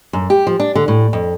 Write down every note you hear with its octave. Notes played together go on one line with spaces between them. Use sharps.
F#2
G4
F3
D4
D3
A2
F2